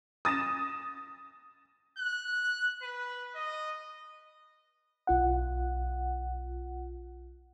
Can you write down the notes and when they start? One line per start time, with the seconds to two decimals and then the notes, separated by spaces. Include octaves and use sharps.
0.25 D#6 A6 A#6 E7
1.99 F#6
2.82 B4
3.36 D#5
5.07 B1 F4 F#5